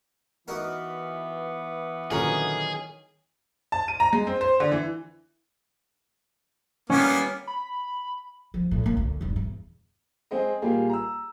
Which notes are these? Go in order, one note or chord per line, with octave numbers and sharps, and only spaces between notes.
E3 B3 D#4 F#4 A#4
A#2 D3 D#3 F#3 C#4 G#4 A#5
A5
D#7
A#5
G#3
C4
C5
D3
E3
G3 A#3 B3 C#4
B5
F3
A2
G1 A#3
D2
E1 G2
E2
G#3 C4 G#4 D#5
A#2 G3 A#3 F4 G4 G#4
A#5 E6